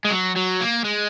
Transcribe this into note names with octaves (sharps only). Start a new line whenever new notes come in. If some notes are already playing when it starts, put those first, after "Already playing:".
G#3
F#3
F#3
A#3
G#3